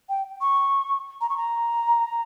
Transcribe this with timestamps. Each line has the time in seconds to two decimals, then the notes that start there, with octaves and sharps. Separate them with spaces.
0.09 G5
0.41 C#6
1.21 A#5
1.29 C#6
1.37 A#5